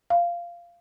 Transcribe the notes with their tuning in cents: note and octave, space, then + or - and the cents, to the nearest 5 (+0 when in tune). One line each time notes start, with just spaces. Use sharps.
F5 -15